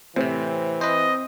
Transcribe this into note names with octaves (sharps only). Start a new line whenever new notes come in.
A2 C3 E3 C4
B4 C5 D#5